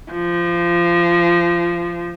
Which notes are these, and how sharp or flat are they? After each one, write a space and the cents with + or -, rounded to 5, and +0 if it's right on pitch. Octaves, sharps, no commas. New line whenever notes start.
F3 -20